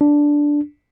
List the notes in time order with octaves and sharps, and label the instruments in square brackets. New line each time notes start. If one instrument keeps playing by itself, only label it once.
[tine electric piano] D4